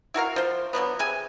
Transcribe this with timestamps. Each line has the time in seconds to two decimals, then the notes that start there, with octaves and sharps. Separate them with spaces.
0.14 E4 F#4 A#4 F5
0.36 F3 C5
0.73 D3 F3 F#3 B3
0.99 C3 G#4 G#5